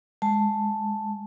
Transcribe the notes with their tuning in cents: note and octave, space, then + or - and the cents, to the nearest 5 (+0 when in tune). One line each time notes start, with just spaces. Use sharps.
G#3 +0 A5 +0